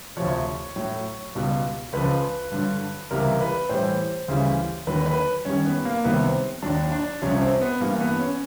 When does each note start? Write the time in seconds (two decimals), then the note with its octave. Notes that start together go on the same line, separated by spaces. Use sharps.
0.17 D2 C3 F3 C#5
0.76 A2 F#3
1.35 C#2 B2 G3
1.93 C#2 C#3 F3 B4
2.52 G2 D3 F#3
3.11 C#2 C3 E3 G3 A#4
3.41 B4
3.69 A2 E3 G3 C5
4.28 D2 C#3 E3 G3
4.87 D#2 D3 F#3 B4
5.06 B4
5.45 F#2 D#3 G3 C#4
5.66 B3
5.85 A#3
6.04 C2 C3 D#3 F#3 B3
6.23 C4
6.62 D#2 D#3 F#3 D4
6.92 D4
7.22 C2 C3 F3 C#4
7.42 C4
7.61 B3
7.80 G2 E3 G3 A#3
8.00 B3
8.19 C#4